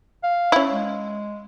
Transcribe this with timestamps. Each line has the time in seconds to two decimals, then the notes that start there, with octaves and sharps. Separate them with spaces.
0.24 F5
0.52 C#4 E4
0.71 G#3